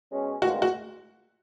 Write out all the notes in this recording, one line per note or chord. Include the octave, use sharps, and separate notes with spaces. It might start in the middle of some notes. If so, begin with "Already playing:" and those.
B2 G#3 C#4
G2 D#3 G#3 C4 F4 F#4
F#4